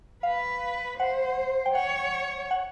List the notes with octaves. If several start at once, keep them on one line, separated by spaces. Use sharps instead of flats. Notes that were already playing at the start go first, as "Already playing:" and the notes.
B4 F5
C5 F#5
G5
C#5 F#5
F#5